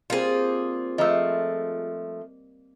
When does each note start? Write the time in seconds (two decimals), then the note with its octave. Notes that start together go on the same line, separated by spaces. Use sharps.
0.10 G3 A#3 C4 F4 G#4
0.98 F3 A3 D#5 A#5 E6